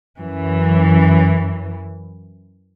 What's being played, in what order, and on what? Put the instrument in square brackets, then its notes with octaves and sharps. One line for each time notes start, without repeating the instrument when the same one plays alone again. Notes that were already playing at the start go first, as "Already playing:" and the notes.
[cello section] F#2 E3